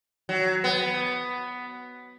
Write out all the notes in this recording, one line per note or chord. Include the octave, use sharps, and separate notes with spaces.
F#3
B3